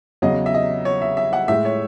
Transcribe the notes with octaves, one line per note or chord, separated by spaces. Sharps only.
E2 C#3 F#3 D#5
E5
D#5
C#5
E5
E5
F#5
A2 G#3 E5
C#5